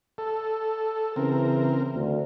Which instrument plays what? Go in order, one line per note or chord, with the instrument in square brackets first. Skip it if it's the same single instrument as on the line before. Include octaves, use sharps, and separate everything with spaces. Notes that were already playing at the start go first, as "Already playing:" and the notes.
[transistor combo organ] A4
[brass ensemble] C#3 E3 [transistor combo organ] C4 A#4
[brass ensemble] D2